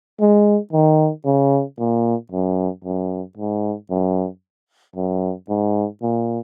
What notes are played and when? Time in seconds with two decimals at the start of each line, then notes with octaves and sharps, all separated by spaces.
0.20 G#3
0.73 D#3
1.25 C#3
1.78 A#2
2.31 F#2
2.84 F#2
3.37 G#2
3.90 F#2
4.96 F#2
5.49 G#2
6.02 A#2